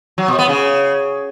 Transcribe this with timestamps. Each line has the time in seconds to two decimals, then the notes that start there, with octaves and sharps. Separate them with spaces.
0.18 F#3
0.28 B2
0.39 B3
0.49 C#3